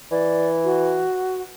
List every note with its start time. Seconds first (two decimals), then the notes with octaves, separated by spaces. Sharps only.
0.11 E3 D5
0.64 F#4